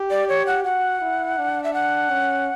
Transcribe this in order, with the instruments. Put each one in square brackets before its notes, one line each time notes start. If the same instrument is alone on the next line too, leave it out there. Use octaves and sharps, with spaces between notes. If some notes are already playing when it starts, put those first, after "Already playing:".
Already playing: [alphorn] G4
[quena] D5
C#5
F#5
[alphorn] F#4 [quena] F#5
[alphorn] E4
D4
[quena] E5
F#5
[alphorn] C#4